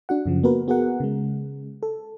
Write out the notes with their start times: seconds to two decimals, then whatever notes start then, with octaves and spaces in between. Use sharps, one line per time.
0.09 D4 F#4 F#5
0.26 F#2 C#3 F3
0.43 A#3 B3 F#4 A#4 B4
0.68 B3 F#4 G#4 A#4 F#5
1.00 C#3 G#3
1.83 A4